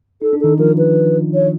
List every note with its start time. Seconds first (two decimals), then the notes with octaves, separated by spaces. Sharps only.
0.22 D#4 A4
0.33 D4
0.40 D#3 D#4 A4
0.59 F3 F4 A#4
0.78 B4
1.34 C#5